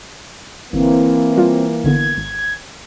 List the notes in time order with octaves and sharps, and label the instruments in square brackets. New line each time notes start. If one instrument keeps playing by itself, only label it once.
[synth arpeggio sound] G1 [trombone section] E3 A#3 [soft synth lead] C4
[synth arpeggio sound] G3 F4
[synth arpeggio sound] G#1 D3 B3 [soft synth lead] G#6
[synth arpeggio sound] G#1